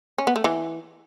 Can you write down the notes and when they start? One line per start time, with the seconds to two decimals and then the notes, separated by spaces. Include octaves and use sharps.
0.18 C#4
0.27 B3
0.36 A3
0.44 E3